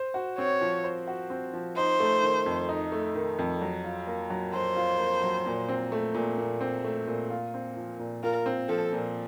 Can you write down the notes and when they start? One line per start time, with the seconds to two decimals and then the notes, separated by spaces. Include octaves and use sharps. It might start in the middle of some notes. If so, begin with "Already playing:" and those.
Already playing: C5
0.14 F#4
0.38 C4 C#5
0.61 F3
0.84 C5
1.07 F#4
1.30 C4
1.54 F3
1.77 D#4 C5
2.00 A3
2.23 D#3
2.46 F2
2.69 D#4
2.92 A3
3.15 D#3
3.39 F2
3.61 F#3
3.84 F4
4.07 A#3
4.30 F#3
4.53 F#3 C5
4.76 F4
4.99 A#3
5.23 F#3
5.46 A#2
5.69 C4
5.92 A3
6.14 A#2
6.38 A#2
6.61 C4
6.84 A3
7.07 A#2
7.30 F4
7.54 C4
7.77 F3
7.99 A#2
8.23 F4 A#4
8.46 C4
8.69 F3 A4
8.93 A#2